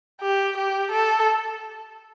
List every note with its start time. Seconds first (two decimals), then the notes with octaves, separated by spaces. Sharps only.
0.22 G4
0.57 G4
0.92 A4